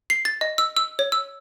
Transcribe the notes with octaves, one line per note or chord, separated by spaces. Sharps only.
C7
A6
D#5
E6
E6
C#5
E6